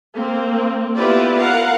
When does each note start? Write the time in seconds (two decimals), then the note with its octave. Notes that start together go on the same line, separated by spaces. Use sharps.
0.15 A#3 C4
0.96 B3 E4 F4 G4 B4 D5
1.37 A#4 F5 F#5